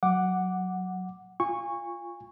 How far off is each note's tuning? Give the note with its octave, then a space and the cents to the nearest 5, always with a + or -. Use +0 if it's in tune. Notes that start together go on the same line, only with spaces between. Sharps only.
F#3 +0 F#5 +0 D6 +0
F4 +0 G#5 -30 C#6 +0